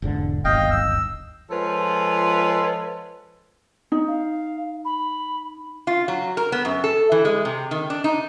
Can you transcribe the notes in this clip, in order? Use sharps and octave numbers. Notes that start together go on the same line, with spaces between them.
E1 G#2 D3
D1 G1 D#2 D#5 F5 G5
E6
F3 G#3 F4 A4 B4 C#5
D#4
F5
B5
F4
F#3
A#4
B3
F#2
A4
E3
G#3
C3
D#3
D4
D#4